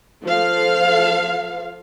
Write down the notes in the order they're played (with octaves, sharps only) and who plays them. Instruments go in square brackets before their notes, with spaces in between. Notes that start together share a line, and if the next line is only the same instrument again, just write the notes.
[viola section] F3 A4 F5